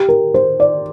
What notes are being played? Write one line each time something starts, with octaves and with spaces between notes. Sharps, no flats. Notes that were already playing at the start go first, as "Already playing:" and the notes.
Already playing: G4
A#4
C5
D5